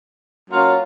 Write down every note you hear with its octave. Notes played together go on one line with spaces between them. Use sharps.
F#3 A#3 C#4 F4